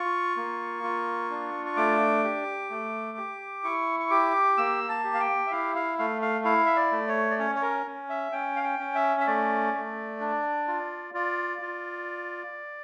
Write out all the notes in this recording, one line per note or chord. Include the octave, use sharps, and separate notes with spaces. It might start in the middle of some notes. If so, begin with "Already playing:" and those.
Already playing: F4 C#6
A#3
F4
D4
C#6
A3 D6
G4
A3
G4
E4 C#6
C#6
G4 D6
A#3 E6
A5
G4
F5
G5
E5
E4 F5
F5
A3 F5
F5
E4 F5
E5
D5
A3
C#5
D5
C#4 C#5
C#5
A#4
C#4
E5
C#4 G5
F5
G5
C#4
E5
E5
A3 D5
A3
D4
F4
F4 D5
F4